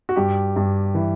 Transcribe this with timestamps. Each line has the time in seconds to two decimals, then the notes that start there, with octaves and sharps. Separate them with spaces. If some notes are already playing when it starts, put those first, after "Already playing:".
0.09 F#4
0.16 G2 G4
0.56 G2
0.95 E3